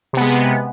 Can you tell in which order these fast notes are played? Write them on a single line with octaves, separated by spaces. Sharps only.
C3 B3 G#3